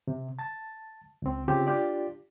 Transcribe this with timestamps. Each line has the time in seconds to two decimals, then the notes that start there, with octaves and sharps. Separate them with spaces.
0.07 C3
0.39 A5 A6
1.22 C#2 C4
1.48 C#3 C4 F4 G4
1.67 D4 F4 G4 D5